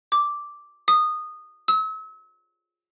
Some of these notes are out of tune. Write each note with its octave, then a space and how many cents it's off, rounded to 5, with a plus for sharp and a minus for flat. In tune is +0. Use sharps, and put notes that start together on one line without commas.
D6 -5
D#6 -15
E6 -40